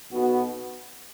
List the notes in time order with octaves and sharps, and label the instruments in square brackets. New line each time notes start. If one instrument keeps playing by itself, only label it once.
[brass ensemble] B1 B2 B3 F#4